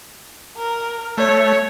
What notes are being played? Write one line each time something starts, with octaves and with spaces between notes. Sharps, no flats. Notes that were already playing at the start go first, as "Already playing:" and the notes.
A#4
A3 C#5